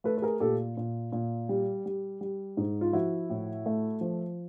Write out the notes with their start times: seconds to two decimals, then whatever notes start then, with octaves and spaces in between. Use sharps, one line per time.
0.04 A3 A4 B4
0.18 B4
0.22 G#4 A#4
0.40 A#2 G4 A4
0.77 A#2
1.12 A#2
1.49 G3
1.86 G3
2.21 G3
2.57 G#2
2.81 F4
2.93 F3 E4 F#4
3.30 A2
3.66 A3
4.01 F3